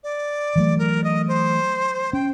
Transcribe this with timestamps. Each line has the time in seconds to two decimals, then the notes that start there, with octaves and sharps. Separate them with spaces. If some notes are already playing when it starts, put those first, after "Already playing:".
0.03 D5
0.56 E3 F#3 A3
0.78 A#4
1.04 D#5
1.28 C5
2.13 C#4 G5